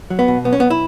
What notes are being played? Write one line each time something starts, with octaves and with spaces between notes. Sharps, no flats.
F#3
B3
B2
B1 B3
C#4
B1 B3
E4